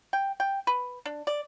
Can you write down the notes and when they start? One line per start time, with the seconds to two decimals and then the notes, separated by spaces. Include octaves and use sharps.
0.13 G5
0.40 G5
0.67 B4
1.06 D4
1.27 D5